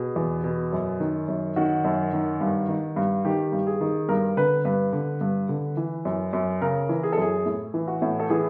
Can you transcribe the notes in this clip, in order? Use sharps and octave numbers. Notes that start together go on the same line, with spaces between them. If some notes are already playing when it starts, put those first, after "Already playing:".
Already playing: B2 G#4
E2
B2
F#2
D#3
F#2
D#3 F#4
F#2
D#3
G2
D#3
G2
D#3 G4
G2
G#4
D#3
G2 A#4
D3 B4
G2 B4
D3
G2
D3
E3
F#2
F#2
C#3 A#4
E3
G#4
A4
F#2 G#4
A2
E3
F#4
A2
A4
E3 G#4